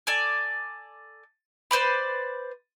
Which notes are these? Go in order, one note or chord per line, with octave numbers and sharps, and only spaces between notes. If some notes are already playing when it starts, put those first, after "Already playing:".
A4 D5 G#5
B4 C5 D5 B5